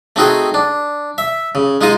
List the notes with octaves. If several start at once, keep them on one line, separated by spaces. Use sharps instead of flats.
A3 C4 D#4 F#4 G#4 G5
D4
E5
C#3
G#3 D#4 F4 D#5